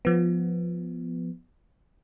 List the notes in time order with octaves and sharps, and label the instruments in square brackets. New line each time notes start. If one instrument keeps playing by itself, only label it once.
[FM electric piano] F3 B3